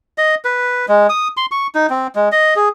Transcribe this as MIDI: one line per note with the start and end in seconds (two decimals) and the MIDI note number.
0.18 0.35 75
0.45 0.86 71
0.89 1.07 56
1.09 1.28 87
1.37 1.46 84
1.51 1.67 85
1.75 1.87 63
1.90 2.07 60
2.15 2.29 56
2.32 2.54 75
2.56 2.69 68